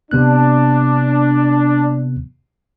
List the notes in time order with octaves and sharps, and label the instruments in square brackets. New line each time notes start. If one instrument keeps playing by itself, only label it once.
[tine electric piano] C3 B3 F#6 [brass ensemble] D4